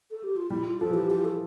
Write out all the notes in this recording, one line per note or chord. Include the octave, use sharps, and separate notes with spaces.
A4
G4
F4
G3 E4
F4
F3 A4
E3
G4
F3 G4
A4